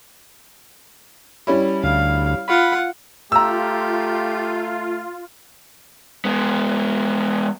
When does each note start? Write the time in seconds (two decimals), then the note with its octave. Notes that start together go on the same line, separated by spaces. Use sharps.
1.47 G3 C#4 E4
1.83 D2 F5
2.48 F4 F#5 B5
3.32 A3 F4 G4 A#5 E6
6.25 G#3 B3